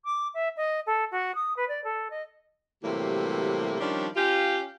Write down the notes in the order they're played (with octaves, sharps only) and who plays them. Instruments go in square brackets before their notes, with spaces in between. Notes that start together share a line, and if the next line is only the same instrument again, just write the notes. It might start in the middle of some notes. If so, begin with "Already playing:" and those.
[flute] D6
E5
D#5
A4
F#4
D#6
B4
D5
A4
D#5
[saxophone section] A2 C3 E3 F#3 G3 A#3
D#3 F3 G3 C#4 D4
C#4 F4 G4